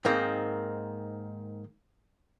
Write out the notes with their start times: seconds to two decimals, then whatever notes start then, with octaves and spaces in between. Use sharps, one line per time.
0.05 G#2 D#3 A#3 C4